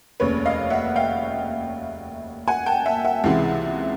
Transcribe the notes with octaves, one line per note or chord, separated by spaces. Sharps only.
F1 D#2 C#3 B4 C#5
D#5 F5
E5 F#5
F5 G5
F#5 G#5
G5 A5
E5 F#5
E5 F#5
C#2 C3 E3 G#3